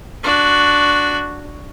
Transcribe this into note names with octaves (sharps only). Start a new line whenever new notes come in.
D4 F#4